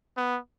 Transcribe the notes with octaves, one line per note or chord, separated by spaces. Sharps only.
B3